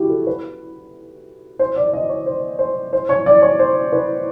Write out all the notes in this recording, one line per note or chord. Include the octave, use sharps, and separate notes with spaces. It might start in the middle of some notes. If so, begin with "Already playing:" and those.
Already playing: E4 F#4 G4
A4
B4
C5
D5
D#5
C#5
C5
C5
C5
C#5
D5
C#5
C5
B4